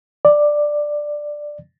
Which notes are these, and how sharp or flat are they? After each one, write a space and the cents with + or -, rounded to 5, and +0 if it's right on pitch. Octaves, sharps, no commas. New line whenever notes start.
D5 +10